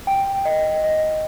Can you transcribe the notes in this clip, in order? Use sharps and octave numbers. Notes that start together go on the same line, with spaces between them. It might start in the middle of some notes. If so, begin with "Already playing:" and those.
G5
D#5
D#5